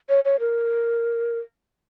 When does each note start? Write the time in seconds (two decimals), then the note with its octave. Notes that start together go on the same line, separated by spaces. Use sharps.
0.09 C#5
0.25 C#5
0.40 A#4